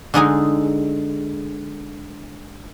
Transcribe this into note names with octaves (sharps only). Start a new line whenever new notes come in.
D3 G#3 D#4 G#4